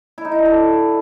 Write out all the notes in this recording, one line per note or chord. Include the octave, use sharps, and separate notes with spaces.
E4
D#4
E4
D4
A4